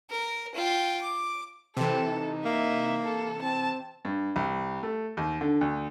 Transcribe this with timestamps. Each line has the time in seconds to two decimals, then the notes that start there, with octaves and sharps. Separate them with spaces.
0.10 A#4
0.54 F4 G5
1.02 D6
1.77 C3 E3 C4 A4
2.09 D#4
2.45 A#3 E5
3.03 A4
3.42 C4 A5
4.05 G2
4.36 C2
4.83 A3
5.17 D#2
5.41 D3
5.61 D2